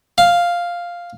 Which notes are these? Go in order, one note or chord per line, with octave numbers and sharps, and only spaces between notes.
F5